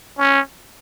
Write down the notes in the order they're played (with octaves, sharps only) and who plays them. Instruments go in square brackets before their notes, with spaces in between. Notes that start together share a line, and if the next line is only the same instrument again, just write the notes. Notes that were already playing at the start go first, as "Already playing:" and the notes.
[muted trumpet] C#4